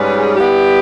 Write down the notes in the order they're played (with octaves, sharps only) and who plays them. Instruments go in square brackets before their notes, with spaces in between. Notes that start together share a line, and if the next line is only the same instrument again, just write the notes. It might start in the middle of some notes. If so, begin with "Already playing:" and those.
Already playing: [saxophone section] G#2 G3 C#4 G#4 B4
G3 B3 E4 G4